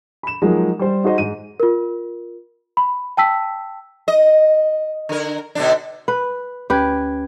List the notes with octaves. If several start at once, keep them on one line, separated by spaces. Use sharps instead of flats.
B5 E7
F3 F#3 G#3 A#3 D#4
G3 C5
D#4 F#4 G#4 C5 D#5
G#2 D#7
F4 A#4
B5
G5 A5 E6 B6
D#5
D3 A#4
B2 D3 D4
B4
D2 C#4 G4 B4 G#6